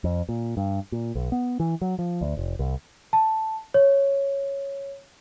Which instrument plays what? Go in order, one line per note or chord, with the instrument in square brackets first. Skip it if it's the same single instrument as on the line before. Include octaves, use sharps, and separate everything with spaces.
[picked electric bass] F2
A#2
G2
A#2
B1
B3
E3
F#3
F3
D2
F1
C2
[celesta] A5
C#5